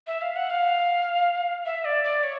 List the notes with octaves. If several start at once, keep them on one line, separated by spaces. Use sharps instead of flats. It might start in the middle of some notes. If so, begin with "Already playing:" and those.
E5
F5
F#5
F5
E5
D5
D5
C#5